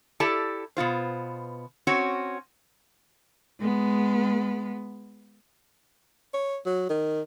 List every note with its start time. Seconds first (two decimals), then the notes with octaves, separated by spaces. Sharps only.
0.20 E4 G4 A4 D5 A5
0.77 B2 B3 F4 C5
1.87 C4 C#4 F#4 C#5
3.60 G#3 B3
6.34 C#5
6.66 F#3
6.89 D#3